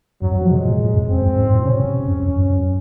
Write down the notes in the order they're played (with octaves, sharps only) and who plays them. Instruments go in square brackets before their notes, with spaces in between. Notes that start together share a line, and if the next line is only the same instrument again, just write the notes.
[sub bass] F#2 [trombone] F#3
[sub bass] F#2
F3
[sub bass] C3 [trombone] G#3
[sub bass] A#2
A#2
F#2
[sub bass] F2 [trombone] C4
[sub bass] F#2
G#2
G#2
A#2
[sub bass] C3 [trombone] C#4
[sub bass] C3
F#2
F2
F#2